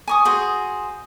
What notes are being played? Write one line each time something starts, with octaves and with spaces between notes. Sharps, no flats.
G#5 C#6 D#6
F#4 G#4 C5